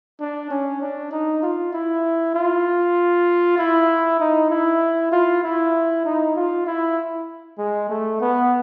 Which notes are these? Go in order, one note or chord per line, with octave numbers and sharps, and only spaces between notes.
D4
C#4
D4
D#4
F4
E4
F4
E4
D#4
E4
F4
E4
D#4
F4
E4
G#3
A3
B3